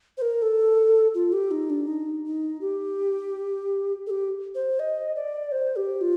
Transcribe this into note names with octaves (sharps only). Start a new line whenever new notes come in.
C5
A#4
A4
F4
G4
D#4
D4
D#4
D#4
G4
A4
G4
C5
D#5
D5
C5
G4
F4